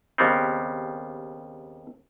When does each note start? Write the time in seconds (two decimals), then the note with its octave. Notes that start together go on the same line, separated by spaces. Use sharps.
0.18 D#2 C#3 G3 B3 C4